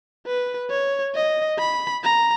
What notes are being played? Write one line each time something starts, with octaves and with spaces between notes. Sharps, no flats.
B4
C#5
D#5
B5
A#5